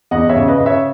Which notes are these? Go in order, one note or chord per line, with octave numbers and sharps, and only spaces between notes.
E2 D#5 F#5
C#5 E5
C#3
B4 D#5
C#3
C#5 E5